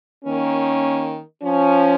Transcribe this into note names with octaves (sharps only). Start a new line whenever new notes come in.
D#3 A#3 C#4
F3 C#4